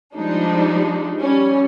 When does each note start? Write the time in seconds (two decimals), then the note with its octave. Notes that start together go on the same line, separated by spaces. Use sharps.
0.16 F3 G3 G#3 D4 D#4
1.20 G3 C#4